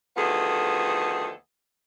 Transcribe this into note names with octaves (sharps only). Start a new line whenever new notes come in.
D2 D#3 F3 B3 G#4 A4